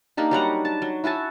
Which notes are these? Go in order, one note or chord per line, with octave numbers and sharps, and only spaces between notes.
A#3 D4 D#4 G4
F#3 G3 F#5 A#5
A5
F#3
E4 F#4 G#5 A5